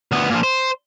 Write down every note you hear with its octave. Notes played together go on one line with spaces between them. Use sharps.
D2 B3
A#2 F3
C5